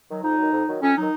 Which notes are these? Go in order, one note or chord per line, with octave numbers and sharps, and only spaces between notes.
D#3 F#3
F2 D#4
D#3 F#3
F2
D#3 F#3
F2 C#4
D#3 F#3 D#4